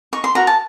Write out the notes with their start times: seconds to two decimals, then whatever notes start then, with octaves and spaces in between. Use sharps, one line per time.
0.13 D#4 C#6
0.24 C6
0.35 F#4 A#4 A#5
0.47 A5